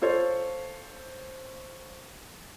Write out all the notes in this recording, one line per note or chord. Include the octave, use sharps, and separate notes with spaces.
F4 A4 C5 C#5